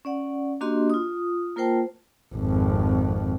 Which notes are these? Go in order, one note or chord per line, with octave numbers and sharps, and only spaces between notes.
C#4 D5 F#5
A#3 D4 F#4 G4 D#5 C6
F4 D#6
A#3 F4 A#4 C5 G5 A5
G#1 F2